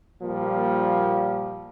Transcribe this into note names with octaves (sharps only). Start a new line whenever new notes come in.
A#2 F3 G3 A#3